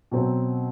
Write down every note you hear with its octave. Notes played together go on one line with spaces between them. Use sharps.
B2 F#3 C4